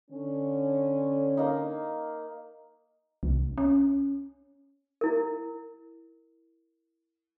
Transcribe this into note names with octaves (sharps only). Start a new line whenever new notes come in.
D3 C#4
A#3 D#4
C2
C#4
E4 A#4